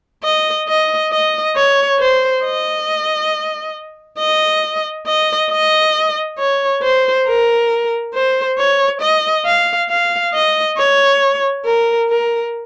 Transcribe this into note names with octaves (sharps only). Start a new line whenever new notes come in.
D#5
D#5
D#5
C#5
C5
D#5
D#5
D#5
D#5
C#5
C5
A#4
C5
C#5
D#5
F5
F5
D#5
C#5
A#4
A#4